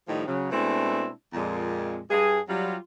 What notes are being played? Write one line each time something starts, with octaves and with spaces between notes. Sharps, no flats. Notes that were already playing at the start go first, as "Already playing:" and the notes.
A2 D#3 F3 G3 D#4
C#3 F#3
B2 G#3 A3 C4 D4 E4
F2 A#2 G#3
G2 G#4
F#3 G3 F4